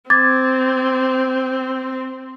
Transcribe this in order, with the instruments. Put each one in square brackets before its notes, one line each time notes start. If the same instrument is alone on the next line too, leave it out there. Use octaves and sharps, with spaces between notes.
[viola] C4 [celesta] D6 G#6 A6